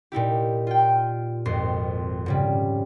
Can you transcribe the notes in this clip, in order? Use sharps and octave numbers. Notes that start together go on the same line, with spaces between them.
A#2 D#4 E4 G4
F4 G5
G#1 F2 C6
G#2 C#3 G3